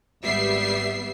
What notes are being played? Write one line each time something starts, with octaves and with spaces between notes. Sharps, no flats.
G#1 G3 B3 E5 C7